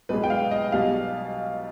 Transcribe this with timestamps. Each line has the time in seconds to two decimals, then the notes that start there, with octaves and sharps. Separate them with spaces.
0.09 B1 B2 G#3 B4
0.23 G5
0.30 F5
0.51 D#5
0.72 B1 B2 G3 F5